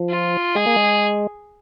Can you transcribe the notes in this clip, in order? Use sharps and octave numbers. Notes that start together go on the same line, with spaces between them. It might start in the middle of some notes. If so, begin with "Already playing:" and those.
Already playing: F3
F4
G#3 G#4
A#3
G#3